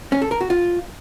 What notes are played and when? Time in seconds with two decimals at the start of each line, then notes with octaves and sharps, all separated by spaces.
0.12 C#4
0.22 A4
0.31 A#4
0.41 F#4
0.50 F4